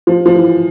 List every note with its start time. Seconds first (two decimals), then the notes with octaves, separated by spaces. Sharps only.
0.07 F3
0.26 F3
0.35 E3